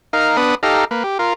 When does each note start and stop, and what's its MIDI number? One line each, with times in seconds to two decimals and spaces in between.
0.13 0.37 63
0.13 0.37 70
0.13 0.37 77
0.37 0.55 59
0.37 0.55 62
0.37 0.55 71
0.37 0.55 87
0.63 0.85 63
0.63 0.85 67
0.63 0.85 69
0.63 0.85 77
0.63 0.85 82
0.91 1.03 58
0.91 1.03 71
1.04 1.18 67
1.19 1.33 65
1.19 1.33 70